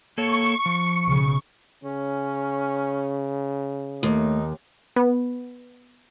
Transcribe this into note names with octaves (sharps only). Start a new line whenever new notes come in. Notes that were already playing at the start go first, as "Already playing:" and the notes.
A#3 A4 C#5 C#6
F3
B1 C#3
C#3 C#4
D#2 A3 D#4
B3